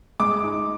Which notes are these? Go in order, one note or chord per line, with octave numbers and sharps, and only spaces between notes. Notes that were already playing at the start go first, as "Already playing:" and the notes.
G#3 D6
D#4